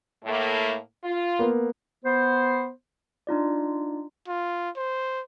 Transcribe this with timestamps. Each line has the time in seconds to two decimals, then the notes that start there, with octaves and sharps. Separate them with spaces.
0.25 A2 A3 A#3
1.04 F4
1.39 A#3 B3
2.04 B3 C5
3.27 D4 D#4 F4 D5
4.28 F4
4.76 C5